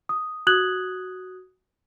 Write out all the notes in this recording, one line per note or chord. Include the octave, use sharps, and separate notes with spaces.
D#6
F#4 D#6 F#6 G#6 F#7